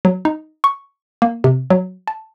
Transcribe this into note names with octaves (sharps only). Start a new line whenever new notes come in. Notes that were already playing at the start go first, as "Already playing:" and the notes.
F#3
D#4
C#6
A#3
C3
F#3
A5